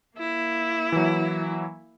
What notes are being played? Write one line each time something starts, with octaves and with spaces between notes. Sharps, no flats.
A#3 E4
E3 F#3